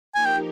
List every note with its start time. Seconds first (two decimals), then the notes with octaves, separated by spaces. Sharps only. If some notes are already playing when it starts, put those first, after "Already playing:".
0.15 F3 A#3 D#4 G4 A#4 G#5
0.26 G5